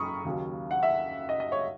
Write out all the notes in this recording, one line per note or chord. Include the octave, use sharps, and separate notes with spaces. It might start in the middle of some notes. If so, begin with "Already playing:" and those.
Already playing: F#1 F#2 A#5 B5 C#6 D#6
D#2 C#3 F#3
F#5
E5
D#5
D#5
C#5